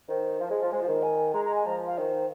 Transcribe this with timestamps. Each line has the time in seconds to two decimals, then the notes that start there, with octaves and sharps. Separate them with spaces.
0.08 D#3 C5
0.40 F3
0.50 G#3
0.62 F3
0.71 G#3 C5
0.81 F3
0.87 D#3
1.02 G#5
1.34 G#3 A#5
1.45 A#5
1.55 G#5
1.66 F3 A#5
1.87 F5
1.98 D#3 C5